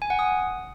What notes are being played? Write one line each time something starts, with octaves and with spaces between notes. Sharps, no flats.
G#5
F#5
D#6